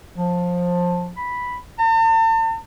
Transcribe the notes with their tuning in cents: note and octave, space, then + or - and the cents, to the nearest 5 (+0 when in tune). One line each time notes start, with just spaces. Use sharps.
F3 +20
B5 -5
A5 +45